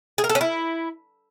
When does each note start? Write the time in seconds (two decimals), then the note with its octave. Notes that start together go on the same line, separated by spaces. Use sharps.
0.18 G#4
0.24 A#4
0.29 A4
0.35 C#4
0.41 E4